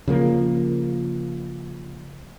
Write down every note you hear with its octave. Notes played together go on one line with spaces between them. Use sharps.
C#3 F3 A#3